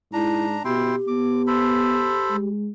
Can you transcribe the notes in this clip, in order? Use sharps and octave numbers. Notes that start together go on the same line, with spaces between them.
G#2 D4 E4 A#5
B2 E4 G4 G5 C6
B3 D6
A4 C5 B5
G#3